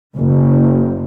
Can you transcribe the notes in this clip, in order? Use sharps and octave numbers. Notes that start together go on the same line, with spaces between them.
F#1